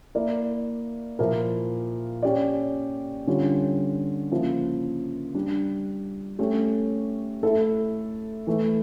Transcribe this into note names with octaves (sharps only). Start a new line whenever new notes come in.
A#3 E4 A#4 D5
A#2 F3 A#3 E4 A#4
C#4 G4 D5
D3 G3 C#4 F4
C#3 F3 A#3 E4
G3 D4 G4
A3 C#4 G4 C#5
A3 E4 A4 E5
E3 A3 E4